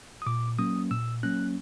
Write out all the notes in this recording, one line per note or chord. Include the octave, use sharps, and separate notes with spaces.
D#6
A#2 D6
F#3 A#3 C#4 D#6
A#2 E6
F#3 A#3 C#4 F#6